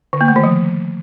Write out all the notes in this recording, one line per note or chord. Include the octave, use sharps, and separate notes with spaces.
D3
A#3
A3
D#3
F3